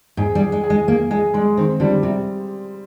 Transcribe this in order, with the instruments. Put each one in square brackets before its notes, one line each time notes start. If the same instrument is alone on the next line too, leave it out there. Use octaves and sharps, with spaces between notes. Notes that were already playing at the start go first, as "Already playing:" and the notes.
[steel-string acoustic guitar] G#2 [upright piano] G#4
[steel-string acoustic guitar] G3
[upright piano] G#4
[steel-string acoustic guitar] G#3
[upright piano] G#4
[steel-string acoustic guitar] G#3
[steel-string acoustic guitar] A#3 [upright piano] G#4
[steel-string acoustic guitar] G#3 [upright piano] G#4
[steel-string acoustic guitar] G3 [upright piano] G#3
[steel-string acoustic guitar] D#3 [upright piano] C4
[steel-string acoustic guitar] D3 [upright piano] G3
[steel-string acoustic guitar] C3 [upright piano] G3